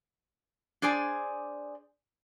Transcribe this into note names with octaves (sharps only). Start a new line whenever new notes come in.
D4 G#4 C5 D5 G#5